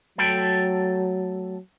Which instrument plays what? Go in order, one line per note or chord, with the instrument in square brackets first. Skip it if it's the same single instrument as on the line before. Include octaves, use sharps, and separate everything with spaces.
[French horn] F#3 [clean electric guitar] A3 A4 G5